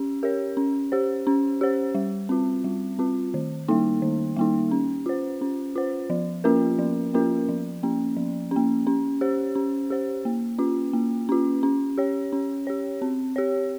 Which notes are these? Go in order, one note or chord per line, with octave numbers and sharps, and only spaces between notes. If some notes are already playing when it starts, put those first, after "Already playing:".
Already playing: C#4 G4
G4 A#4 C#5
C#4
G4 C5
C#4
G4 C5
G3
C4 F4
G3
C4 F4
D#3
G3 A#3 D#4
D#3
G3 A#3 D#4
C#4
F4 C5
C#4
F4 C5
F3
A#3 C#4 F4 A#4
F3
A#3 C#4 F4 A#4
F3
A#3 C#4
F3
A#3 C#4
C#4
G4 C5
C#4
G4 C5
A#3
C#4 F4
A#3
C#4 F4
C#4
G4 C#5
C#4
G4 C#5
C4
G4 C#5